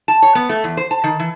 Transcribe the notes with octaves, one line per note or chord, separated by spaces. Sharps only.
A5
C#5
B3
A3
E2
C5
A5
D#3
E3